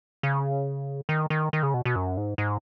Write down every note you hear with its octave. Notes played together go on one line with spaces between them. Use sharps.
C#3
D#3
D#3
D#3
C#3
B2
B2
F#2
G#2
G#2